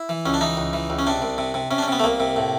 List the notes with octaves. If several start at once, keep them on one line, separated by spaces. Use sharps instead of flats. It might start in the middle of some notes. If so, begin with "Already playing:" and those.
Already playing: E4
E3
C#2 C#4
D4
E3 D#4
C#2
E3
C#2
C#4
C3 D4
C2
C3
C3
C3 C#4
D4
C#4
C3 B3
A3
C2 A#3
C3
A2